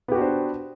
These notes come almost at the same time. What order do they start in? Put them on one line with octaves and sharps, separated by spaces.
B3 G4 F#4 D4 C5